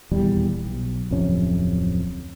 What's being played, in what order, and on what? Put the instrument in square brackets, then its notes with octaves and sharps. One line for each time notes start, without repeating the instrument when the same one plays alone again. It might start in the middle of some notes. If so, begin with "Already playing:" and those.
[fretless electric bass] D#1 E2 G3
B1
D1 F2 C3 C#4